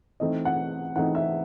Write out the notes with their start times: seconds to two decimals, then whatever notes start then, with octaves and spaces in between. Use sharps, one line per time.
0.20 E3 A3 C4 D#4 D#5
0.45 F#5
0.96 E3 A3 C4 D#4 F#5
1.15 E5